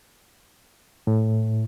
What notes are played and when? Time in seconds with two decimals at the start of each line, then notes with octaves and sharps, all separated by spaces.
1.07 A2